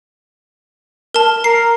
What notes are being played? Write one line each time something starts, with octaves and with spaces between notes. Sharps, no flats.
A#4 A5
A#4 C7